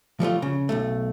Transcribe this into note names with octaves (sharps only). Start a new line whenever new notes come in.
F3 G3 A3 F4
C#3
B1 E2 A3